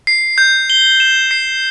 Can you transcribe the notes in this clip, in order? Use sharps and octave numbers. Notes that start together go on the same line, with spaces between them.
C7
G6
G7
E7
C7